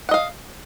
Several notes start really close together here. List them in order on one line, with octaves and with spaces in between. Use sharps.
F#5 D#5 F5